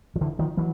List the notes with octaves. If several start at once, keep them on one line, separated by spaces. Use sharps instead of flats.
F3
D3 E3
D#3 F3
E3 F#3